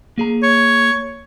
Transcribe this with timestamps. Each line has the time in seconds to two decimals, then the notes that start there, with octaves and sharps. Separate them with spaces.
0.18 A#3 G#4 A#5
0.43 C#5